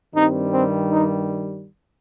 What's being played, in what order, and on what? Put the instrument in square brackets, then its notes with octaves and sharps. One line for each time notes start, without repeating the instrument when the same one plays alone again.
[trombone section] G2 D#3 G3 C4 D#4
C4
D#4